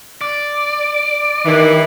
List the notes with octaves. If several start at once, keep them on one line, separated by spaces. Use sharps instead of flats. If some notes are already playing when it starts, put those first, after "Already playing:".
D5
G2 D#3 E3